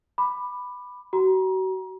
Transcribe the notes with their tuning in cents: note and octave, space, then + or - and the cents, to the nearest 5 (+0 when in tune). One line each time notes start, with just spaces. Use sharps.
B5 +0 D6 +20
F#4 +35 A#5 +30